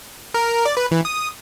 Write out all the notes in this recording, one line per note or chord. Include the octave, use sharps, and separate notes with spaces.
A#4
D5
B4
E3
D#6